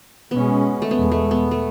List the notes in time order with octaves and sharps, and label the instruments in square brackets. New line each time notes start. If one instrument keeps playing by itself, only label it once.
[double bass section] B2 G#3 C#4 [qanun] B3
[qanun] A3
[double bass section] E2 B2 G#3 [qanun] B3
[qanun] A3
B3
A3